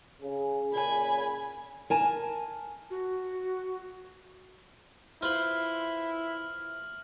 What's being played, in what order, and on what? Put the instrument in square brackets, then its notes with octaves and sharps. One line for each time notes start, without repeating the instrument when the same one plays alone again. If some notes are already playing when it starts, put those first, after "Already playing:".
[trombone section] C#3 G#4
[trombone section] A#2 C#3 [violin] G#5 B5
[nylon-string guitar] A#4 G#5 A5
[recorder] F#4
[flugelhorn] E4 [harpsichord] F4 B4 C5 [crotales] F6 F#7